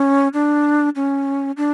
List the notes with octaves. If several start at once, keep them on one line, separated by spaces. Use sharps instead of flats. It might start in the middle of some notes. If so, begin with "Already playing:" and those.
Already playing: C#4
D4
C#4
D4